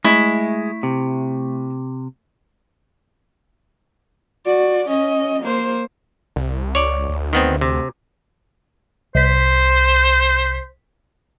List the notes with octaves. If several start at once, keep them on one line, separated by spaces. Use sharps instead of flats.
G#3 A3 E4
C3
F#4 D5
C#4 D#5
A#3 C5
C2
C#2 C#5 D5
D2
D#3 B3 C4
C3
C2 C5 B6